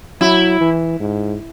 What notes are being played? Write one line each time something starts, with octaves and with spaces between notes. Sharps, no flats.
F#3 E4
E3
G#2